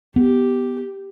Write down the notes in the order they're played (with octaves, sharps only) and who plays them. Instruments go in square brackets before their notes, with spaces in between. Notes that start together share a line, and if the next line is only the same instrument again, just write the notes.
[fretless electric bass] B3 [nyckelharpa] G4